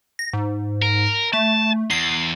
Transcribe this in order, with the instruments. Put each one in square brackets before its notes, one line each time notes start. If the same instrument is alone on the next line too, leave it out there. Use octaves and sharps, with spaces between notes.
[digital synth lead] A#6
G#2
[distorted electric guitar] A#4
[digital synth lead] A3 [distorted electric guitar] A5
[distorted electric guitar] E2 [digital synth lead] C7